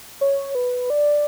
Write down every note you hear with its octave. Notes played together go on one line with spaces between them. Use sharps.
C#5
B4
D5